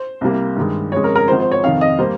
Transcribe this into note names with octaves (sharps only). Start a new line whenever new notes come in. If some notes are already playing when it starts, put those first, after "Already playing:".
Already playing: C5
C2 C3 G3 A#3
G2 D#3 G#3
F2 C#3 G#3 C#5
A#4
A#4
G#1 G#2 F3 C5
C5
C#5
F1 F2 D#3 F5
D#5
G3 A#3 C5